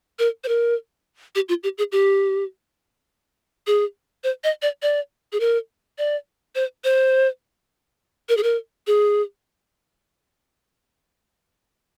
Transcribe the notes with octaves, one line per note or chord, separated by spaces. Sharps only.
A#4
C5
A#4
G4
F4
G4
G#4
G4
G#4
C5
D#5
D5
D5
G#4
A#4
D5
C5
C5
A#4
G#4
A#4
G#4